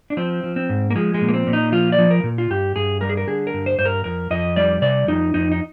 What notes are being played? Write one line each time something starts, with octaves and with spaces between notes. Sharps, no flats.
D4
F3 C4
F3
C4
G#2
A#3
F3 G#3
G#3
A#2
A#3
C4
A#2
D#4
F3 F4
D5
F3
A#4
A#2
F4
G2 G4
G2 G#4
G3 A#4
G#4
A#4
D3 G#4
A#4
G2
C5
G2 C5
A#4
F2 A#4
F2 D#5
G3 D5
C3 D5
F2 D#4
F2 D#4
D#4